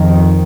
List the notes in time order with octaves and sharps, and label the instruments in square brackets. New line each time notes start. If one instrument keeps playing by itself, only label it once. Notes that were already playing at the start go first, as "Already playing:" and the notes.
Already playing: [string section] F2 D#3